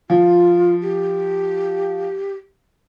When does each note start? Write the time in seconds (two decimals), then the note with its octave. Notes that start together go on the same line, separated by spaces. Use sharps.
0.10 F3 F4
0.82 G4